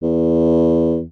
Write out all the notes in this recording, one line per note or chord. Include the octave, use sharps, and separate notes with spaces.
E2